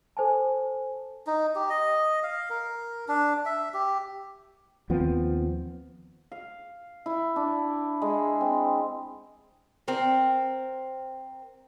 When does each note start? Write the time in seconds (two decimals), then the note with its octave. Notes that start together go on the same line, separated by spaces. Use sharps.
0.17 A4 C5 G#5 A5
1.27 D#4
1.55 G4
1.70 D#5
2.23 F5
2.50 A#4
3.08 D4
3.46 E5
3.74 G4
4.90 D#2 F3 B3 C4
6.32 F5
7.06 E4
7.36 D4
8.02 G#3
8.41 C4
9.88 C4 A#4